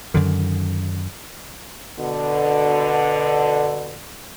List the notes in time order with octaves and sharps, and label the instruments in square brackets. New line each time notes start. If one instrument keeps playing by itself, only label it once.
[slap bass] F#2 D3 D#3
[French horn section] B2 D3